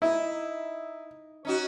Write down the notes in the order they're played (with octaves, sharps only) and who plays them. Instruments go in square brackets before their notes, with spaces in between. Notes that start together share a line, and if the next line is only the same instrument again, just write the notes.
[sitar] D#4 [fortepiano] E4
[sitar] C#4 D#4 F#4